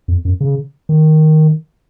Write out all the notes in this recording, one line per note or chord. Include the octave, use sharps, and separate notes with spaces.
F2
F#2
C#3
D#3